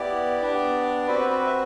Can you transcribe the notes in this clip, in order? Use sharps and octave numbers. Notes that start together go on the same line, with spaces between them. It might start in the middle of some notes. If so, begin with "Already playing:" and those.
Already playing: B3 E4 G4 D5
B3 D4 G4
C4 F#4 B4
B4
E5